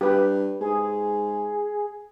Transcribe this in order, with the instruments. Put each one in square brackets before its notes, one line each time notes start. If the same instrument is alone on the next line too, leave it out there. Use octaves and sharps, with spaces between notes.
[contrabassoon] G2 [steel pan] G4 B4
[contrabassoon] G#2 [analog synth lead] G#4